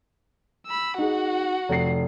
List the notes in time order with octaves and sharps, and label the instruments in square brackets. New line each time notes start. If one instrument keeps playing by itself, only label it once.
[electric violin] B5 E6
[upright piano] D#4 G#4 [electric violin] F#4 F#5
[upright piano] F1 C7